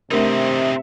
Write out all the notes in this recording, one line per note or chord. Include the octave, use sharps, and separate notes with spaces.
C3 A3 C4 D4 D#4 A#4 E5